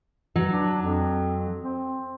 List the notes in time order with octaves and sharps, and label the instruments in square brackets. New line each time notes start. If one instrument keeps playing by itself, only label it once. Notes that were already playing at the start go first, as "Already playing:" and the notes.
[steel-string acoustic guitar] F#3
[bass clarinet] D4
F2
C4